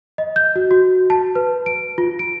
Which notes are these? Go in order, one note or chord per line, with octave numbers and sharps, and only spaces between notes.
D#5
G6
F#4
F#4
A5
B4
D7
F4
D7